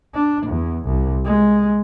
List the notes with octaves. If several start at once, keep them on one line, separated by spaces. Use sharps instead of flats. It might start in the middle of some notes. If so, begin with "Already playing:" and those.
D4
E2
C2
G#3